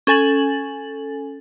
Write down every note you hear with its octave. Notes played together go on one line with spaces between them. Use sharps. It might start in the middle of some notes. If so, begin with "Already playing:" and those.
C#4 A4 G#5 A6 F#7